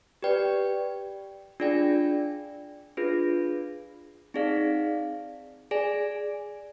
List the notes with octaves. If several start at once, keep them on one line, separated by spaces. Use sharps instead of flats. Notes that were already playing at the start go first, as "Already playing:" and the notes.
G4 B4 D5 G5
D4 F4 G#4 D5 G5
D4 F4 G#4 B4
C4 D#4 G#4 D5 F5
G#4 D5 G#5